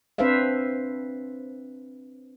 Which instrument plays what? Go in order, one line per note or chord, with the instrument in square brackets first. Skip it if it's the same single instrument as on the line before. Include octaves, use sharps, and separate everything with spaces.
[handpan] C4 D4 B4 C5 E5 F5